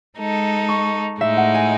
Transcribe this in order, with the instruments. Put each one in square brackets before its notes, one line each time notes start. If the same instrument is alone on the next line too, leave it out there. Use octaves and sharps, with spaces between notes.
[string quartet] G#3 D#4 A4
[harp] C#6
[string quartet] A2 G#3 D#4 [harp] E5
[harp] F#5
G#5